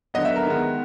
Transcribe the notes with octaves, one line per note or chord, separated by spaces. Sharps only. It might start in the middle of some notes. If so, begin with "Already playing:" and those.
D3 F#3 B3 D#5
E5
A#4
D#3 G#3 B3